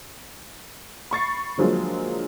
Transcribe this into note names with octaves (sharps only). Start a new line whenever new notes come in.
B5 C#6 A6 C7
D3 F3 F#3 G#3 A#3